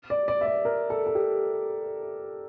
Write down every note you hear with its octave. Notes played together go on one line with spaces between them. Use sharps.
D5
D5
E5
D5
A#4
A4
A4
G4